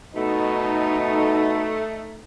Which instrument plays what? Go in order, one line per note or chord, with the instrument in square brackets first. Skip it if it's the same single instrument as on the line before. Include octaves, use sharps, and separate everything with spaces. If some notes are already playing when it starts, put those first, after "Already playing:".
[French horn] B2 [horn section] A3 [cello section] D#4